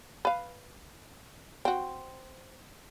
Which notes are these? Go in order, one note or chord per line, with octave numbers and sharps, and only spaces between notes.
B4 F5
C4 F#4